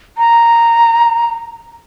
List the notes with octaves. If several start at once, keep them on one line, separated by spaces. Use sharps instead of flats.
A#5